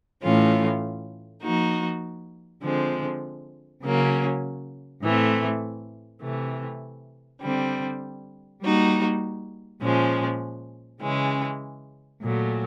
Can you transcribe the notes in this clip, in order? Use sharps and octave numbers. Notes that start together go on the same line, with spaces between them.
A2 E3 A3 C#4 F4
F3 A#3 D#4 F#4
D3 F3 G#3 C4
C#3 F#3 A#3 C#4
A2 E3 A3 C4
C3 E3 A3
D3 G3 C4
G3 A#3 D#4 F#4
A#2 F3 G#3 C#4
C#3 E3 G#3 C#4
A#2 F#3 A3